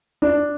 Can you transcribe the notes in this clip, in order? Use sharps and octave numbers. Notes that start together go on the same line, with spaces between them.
D4